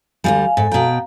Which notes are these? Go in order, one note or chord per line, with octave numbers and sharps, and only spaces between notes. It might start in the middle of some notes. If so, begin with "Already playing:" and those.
D2 G#2 G3 F5 G#5
G#2 A4 G#5
B2 F5 G5 A#5